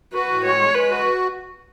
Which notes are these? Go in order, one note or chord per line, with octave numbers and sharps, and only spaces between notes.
F#4 B4
A2
G#3 C#5
G#3
G#3 B4
F#4